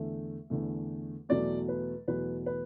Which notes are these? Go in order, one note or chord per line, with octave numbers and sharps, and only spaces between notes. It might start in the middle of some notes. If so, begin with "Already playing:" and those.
Already playing: E2 D3 A3 E5
E2 D3 A3
E2 B2 F#3 A3 D5
B4
E2 B2 F#3 A3 B4
B4